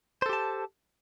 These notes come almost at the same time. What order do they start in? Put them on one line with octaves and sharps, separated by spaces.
C5 A4 G4 A5